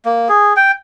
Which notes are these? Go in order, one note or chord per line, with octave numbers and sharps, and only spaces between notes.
A#3
G#4
G5